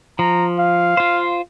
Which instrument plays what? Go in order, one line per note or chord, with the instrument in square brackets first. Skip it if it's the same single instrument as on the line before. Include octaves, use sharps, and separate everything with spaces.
[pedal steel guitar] F3 [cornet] A#5
[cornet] F5
[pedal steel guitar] F4 C5